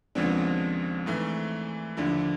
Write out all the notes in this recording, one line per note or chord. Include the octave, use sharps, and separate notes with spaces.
D#2 C#3 F3 G#3 B3 C4 D4
G#2 E3 A3
D#2 D3 F3 D4 E4